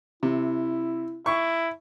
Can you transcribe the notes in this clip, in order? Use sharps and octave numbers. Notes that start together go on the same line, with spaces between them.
C3 E4
E4 C#6